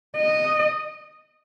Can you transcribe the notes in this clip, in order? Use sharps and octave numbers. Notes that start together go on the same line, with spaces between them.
D#5